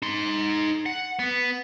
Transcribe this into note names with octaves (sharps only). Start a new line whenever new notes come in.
D#4 C6
F#5
B3